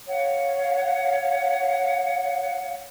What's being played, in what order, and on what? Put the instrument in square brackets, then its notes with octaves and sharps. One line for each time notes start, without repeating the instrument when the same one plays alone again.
[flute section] C#5 F5 F#5